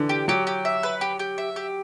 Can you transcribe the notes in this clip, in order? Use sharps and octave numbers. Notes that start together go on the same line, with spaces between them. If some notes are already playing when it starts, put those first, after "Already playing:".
Already playing: D3 E3
G4
F#3 G4
G4
E5
B4
G4
G4
E5
G4